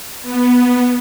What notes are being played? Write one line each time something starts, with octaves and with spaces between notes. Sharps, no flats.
B3